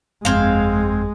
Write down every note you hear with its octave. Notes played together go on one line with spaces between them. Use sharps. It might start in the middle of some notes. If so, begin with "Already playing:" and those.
G1 F2 G#3 C4 F5 G#6